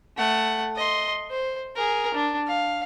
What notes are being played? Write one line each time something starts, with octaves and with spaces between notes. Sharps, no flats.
A3 F#5
D#5 C6
C5
G#4 A#4
D4
F5